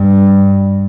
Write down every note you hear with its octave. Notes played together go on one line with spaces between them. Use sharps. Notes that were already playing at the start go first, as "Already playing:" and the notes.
Already playing: G2